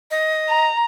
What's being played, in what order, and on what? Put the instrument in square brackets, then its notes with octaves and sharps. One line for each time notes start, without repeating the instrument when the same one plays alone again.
[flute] D#5
[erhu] A#5